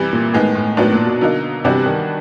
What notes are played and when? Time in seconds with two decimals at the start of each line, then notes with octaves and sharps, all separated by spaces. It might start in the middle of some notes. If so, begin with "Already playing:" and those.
Already playing: C3 E3 G3
0.13 A#2
0.33 A2 D#3 G#3 B3
0.55 A2
0.77 A2 D#3 F#3 B3 D4
0.92 A#2
1.06 B2
1.21 D3 F#3 A#3 D#4
1.64 C3 E3 G3 B3 D4 F#4
1.86 D#3